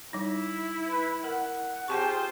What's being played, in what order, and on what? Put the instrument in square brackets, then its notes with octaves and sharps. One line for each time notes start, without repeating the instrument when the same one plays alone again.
[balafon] G3 D#4 [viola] E4
[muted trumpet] B4
[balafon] A#4 [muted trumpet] F#5
[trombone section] C4 G4 G#4 [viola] F4 C5 [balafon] G#5 A5 C#6